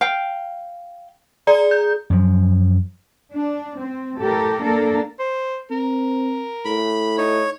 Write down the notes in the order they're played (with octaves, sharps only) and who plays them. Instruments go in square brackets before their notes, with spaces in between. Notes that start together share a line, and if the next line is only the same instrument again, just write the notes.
[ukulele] F5 G5
[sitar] G#4 [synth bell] D5 A#5
[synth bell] G6
[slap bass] F#2 F3
[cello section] D4
C4
A2 G4 A4 A#4
A#3 D4 A4 A#4
[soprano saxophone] C5
[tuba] C4 [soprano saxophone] A#4
[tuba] A2 [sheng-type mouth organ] B5
[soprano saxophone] D#4 [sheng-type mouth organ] C#5